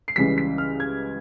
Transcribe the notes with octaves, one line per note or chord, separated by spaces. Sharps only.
C7
C#2 C#3 E3 G3 B6
B6
F6
G#6